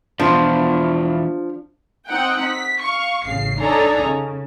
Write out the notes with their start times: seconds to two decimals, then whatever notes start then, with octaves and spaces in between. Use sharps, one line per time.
0.20 E2 B2 F3 D4 F4 C5
2.08 C4 D#4 F#5 G5
2.42 B6
2.82 F5 C#6
3.24 A1 C#3 C7
3.60 D4 D#4 A4 C#5 G#5 A#5
4.03 C#3